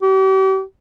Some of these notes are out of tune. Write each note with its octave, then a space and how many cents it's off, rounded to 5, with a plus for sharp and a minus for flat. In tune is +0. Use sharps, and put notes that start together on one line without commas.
G4 -40